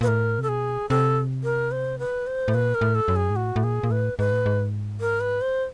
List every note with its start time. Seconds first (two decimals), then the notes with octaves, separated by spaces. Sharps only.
0.01 A#2 B4
0.08 A2 A#4
0.38 C3 A4
0.49 B2 G#4
0.89 C3 A4
1.44 A#4
1.72 C5
1.99 B4
2.27 C5
2.48 A2
2.54 A#2 B4
2.75 A#4
2.81 A2
2.95 A4
3.08 F#2
3.16 G#4
3.30 G#2
3.36 A2 F#4
3.56 A2
3.63 A#2 G#4
3.83 A#2
3.90 A2 B4
4.18 G#2 B4
4.32 A2
4.46 G#2
5.00 A#4
5.21 B4
5.41 C5